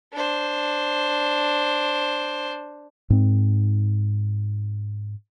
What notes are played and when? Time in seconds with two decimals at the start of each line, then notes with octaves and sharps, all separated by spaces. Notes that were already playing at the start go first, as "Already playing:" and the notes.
0.13 D4 C5
3.10 G#2 C4